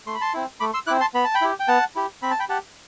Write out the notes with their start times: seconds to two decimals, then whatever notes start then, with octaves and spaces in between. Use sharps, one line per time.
0.06 A3 C6
0.15 B5
0.21 A5 C6
0.34 C4 E4
0.60 A3 B5 D6
0.73 C6 E6
0.87 E4 D6 F#6
0.91 C4
1.00 A5 C6
1.14 B3 B5
1.24 A5
1.34 G5 B5
1.41 E4 G4
1.60 G5
1.68 B3 F#5 A5
1.96 E4 G4
2.22 C4 B5
2.31 A5
2.39 G5 B5
2.49 G4 F#5 A5